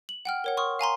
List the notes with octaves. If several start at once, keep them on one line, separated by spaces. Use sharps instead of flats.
F#7
F#5 G5 F6
A#4 C#5 F#5
C6 C#6 D#6 F6
F5 G#5 A#5 C6